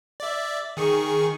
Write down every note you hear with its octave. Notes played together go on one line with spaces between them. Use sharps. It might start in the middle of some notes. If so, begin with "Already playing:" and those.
D5 E5
D#3 G#4 C#6